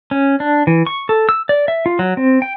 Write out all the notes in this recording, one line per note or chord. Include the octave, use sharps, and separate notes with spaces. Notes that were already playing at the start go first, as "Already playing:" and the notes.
C#4
D4
E3
C#6
A4
E6
D5
E5
F4
F#3
C4
G5